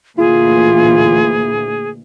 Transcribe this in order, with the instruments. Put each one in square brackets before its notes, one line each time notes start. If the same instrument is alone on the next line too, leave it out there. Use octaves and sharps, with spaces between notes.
[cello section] D2 A#2 E3 [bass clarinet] F4 [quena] G#4